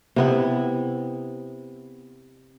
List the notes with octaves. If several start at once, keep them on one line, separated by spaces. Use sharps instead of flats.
C3 B3 E4